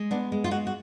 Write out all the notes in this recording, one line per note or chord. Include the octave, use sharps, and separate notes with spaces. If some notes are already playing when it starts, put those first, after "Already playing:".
Already playing: G#3
B3 D4
G#3
F4
G#3 F#4
F#4